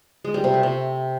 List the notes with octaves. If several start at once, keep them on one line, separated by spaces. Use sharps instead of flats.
G#3
G3
C3
A3
C3